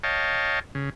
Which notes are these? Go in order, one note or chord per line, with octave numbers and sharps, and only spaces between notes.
C#5 D#5 F5 G5 A5
C#3